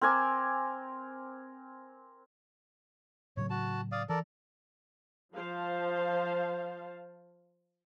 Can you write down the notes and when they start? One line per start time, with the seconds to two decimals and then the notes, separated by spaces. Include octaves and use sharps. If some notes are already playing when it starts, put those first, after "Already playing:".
0.02 C4 A#4 G#5 D6
3.37 A2 C#3 F#3 C#5
3.50 F#4 A5
3.92 D5 F5 D#6
4.09 E3 A4 A#4 D5
5.35 F3 C5 F5 A5